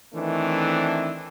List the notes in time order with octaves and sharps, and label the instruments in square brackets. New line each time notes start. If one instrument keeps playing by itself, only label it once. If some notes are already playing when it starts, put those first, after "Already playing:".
[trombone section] D#3 E3 A3 C4 D4